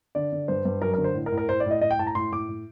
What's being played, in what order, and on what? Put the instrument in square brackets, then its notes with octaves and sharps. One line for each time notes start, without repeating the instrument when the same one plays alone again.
[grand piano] D3 D5
D3
G2 C5
G2
F#2 A#4
D3 A#4
C5
A2
A#4
A2
A#4
A2 C5
D5
A2 D#5
A2 D#5
G5
A2 A5
A#5
A2 C6
A2 D6
A2